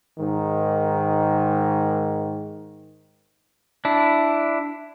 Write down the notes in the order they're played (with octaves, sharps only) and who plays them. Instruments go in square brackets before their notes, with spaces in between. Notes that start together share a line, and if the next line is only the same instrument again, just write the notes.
[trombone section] G#2 D#3
[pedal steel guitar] D4 E4